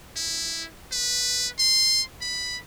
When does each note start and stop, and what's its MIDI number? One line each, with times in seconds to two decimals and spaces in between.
0.16 0.66 64
0.92 1.48 71
1.59 2.02 84
2.21 2.58 83